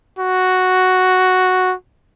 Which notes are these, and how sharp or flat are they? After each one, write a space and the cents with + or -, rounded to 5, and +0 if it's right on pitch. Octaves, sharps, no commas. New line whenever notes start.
F#4 +0